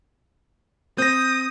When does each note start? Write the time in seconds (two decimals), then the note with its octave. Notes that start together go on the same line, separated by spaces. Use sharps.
0.98 C4 D#6 G6 A#6